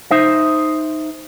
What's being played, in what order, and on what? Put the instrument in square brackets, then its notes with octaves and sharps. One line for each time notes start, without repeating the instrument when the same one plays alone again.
[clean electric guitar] D#4 C5 E5